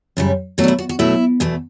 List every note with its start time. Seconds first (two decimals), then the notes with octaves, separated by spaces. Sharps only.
0.17 F#2 C#3 G3
0.58 B2 F#3 A3 F#4
0.64 D4
0.68 E4
0.79 F#4
0.89 F#4
0.99 B2 F#3 A3 E4
1.40 E2 B2 A3